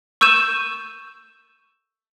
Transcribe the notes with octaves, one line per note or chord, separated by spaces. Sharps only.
C#6 E6 G6 D#7 E7